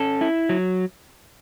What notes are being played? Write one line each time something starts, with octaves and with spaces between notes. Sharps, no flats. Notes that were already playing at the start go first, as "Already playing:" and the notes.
Already playing: C#4 A4
E4
F#3